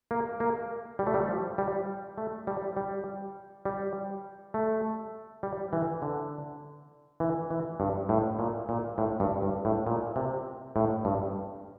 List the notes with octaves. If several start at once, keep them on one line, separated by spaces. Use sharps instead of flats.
A#3
A#3
G3
A3
G3
F3
G3
A3
G3
G3
G3
A3
G3
E3
D3
E3
E3
G2
A2
A#2
A#2
A2
G2
G2
A2
A#2
C3
A2
G2